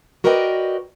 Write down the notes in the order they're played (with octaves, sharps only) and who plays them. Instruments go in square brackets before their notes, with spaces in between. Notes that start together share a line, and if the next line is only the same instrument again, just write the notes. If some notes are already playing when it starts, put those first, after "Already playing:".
[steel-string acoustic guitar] F#4 A#4 B4 D5 D#5 G5